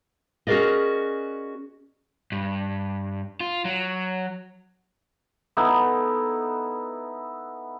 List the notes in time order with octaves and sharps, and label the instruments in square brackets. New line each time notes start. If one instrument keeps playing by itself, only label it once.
[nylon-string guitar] C#4 F#4 G#4 A#4 D5 D#5
[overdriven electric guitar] G2
F4
F#3
[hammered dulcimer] B3 D#4 E4 A4